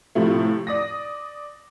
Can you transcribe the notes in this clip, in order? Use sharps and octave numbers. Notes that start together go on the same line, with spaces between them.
A2 C3 F3 A3
D5 D#6 A#6